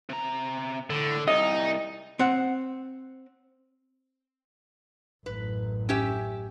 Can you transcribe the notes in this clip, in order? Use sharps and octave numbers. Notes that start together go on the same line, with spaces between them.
C3 A#5
A2 D3
C2 D#4 D#5
C4 F#5
A1 F#2 B4
C#4 G4 E5